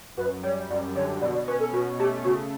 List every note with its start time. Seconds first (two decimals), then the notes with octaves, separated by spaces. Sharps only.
0.17 F#2 B4
0.43 G3 C#5
0.70 F#2 D5
0.95 D3 C#5
1.21 B2 D5
1.35 D5
1.47 C#4 B4
1.60 A4
1.73 B2 F#4
1.99 A3 G4
2.24 C#3 F#4